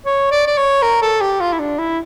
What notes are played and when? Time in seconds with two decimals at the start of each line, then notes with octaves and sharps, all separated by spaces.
0.06 C#5
0.31 D5
0.47 D5
0.57 C#5
0.83 A#4
1.02 A4
1.21 G4
1.40 F4
1.53 E4
1.59 D4
1.79 E4